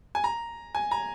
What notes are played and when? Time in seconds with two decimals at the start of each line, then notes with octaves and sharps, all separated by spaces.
0.15 G#5
0.24 A#5
0.75 G#5
0.91 A#5